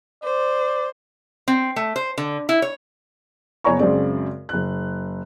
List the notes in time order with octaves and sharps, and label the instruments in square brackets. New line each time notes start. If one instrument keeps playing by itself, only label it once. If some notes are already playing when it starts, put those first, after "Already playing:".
[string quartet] C5 [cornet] D5
[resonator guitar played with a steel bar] C4
A3
C5
D3
E4
C#5
[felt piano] F#1 B3 C#5 G#5 A#5 C#6
F#2 C#3 G#3 C4 D5
F#1 F#6